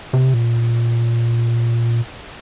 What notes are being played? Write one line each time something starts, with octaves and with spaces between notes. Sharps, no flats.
C3
A#2